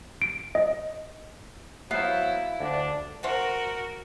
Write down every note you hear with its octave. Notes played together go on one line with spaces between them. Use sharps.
D7
D#5
F#3 B3 E4 C5 F5
D2 D4
F#4 A#4 C5 E5 F#5